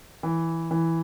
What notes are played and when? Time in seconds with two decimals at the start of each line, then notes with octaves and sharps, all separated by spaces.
0.23 E3
0.71 E3